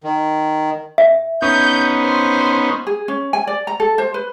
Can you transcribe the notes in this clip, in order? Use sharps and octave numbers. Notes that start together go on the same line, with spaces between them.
D#3
E5
B3 C#4 D#4 G6
C5
G#4
C#4
G#5
D5
A#5
A4
C5
B4